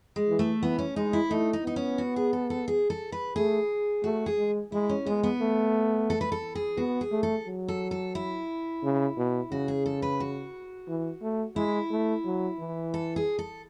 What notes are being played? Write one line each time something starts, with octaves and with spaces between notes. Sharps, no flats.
G#3
E3
A3
E3 B3
C#4
G#3 D#4
E4
A3 D#4
D#4
B3 D#4
C#4
F#4
G#4
A4
A4
G#4
A4
B4
A3 G#4
A3 F#4
G#4
G#3
G#3 E4
C#4
G#3 B3
B3
A3
A4
B4
A4
G#4
B3 F#4
G#4
A3
A4
F#3
A4
A4
E4
C#3
B2
C#3 F#4
G#4
A4
B4
F#4
E3
A3
G#3 E4
A3
F#3
E3
A4
G#4
A4